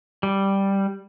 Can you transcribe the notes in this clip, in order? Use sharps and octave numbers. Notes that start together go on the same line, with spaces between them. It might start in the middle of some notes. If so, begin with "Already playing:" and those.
G3